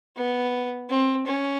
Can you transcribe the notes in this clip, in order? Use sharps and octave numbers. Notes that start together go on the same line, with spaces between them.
B3
C4
C#4